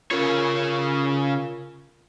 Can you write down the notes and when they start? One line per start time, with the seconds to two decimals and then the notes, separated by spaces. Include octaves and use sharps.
0.11 C#3 F4 A#4 C#5